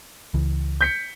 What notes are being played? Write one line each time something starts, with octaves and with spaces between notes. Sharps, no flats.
C#2 E3
G6 B6 C#7